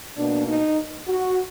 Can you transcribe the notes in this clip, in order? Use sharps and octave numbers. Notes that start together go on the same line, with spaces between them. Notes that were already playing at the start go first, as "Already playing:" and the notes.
B2 A#3 D4
D#4
F#4